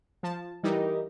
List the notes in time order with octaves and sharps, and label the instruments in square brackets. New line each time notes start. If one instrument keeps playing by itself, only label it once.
[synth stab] F3 A5
[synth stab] E3 G3 D#4 [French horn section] G4 A#4 D#5